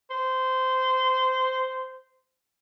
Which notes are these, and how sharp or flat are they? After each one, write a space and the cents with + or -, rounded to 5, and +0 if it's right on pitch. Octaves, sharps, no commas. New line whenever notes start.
C5 -15